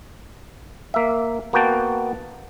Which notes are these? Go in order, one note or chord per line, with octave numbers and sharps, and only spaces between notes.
A#3 E5
A#3 B3 F#4 G5 A5